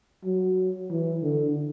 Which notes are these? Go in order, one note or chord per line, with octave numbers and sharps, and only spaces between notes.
F#3
E3
D3